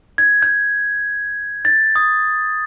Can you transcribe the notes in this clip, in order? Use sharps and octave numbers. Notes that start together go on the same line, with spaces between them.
G#6
G6
A6
D#6